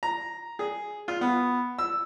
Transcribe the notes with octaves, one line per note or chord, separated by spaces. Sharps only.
A#5
G#4
F4
B3
E6